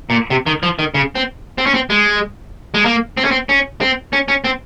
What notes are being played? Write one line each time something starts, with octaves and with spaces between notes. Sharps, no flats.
A#2
C3
D#3
F3
D#3
C#3
C4
C4
C#4
C4
G#3
G#3
A#3
C4
C#4
C4
C#4
C4
C#4
C#4
C4